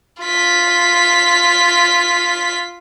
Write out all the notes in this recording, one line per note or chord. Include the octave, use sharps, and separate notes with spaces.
F4 B6